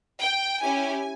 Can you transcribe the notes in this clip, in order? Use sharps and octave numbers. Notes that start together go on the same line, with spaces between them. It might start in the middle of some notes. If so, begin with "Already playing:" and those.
G5
C#4 E4 G4 G#5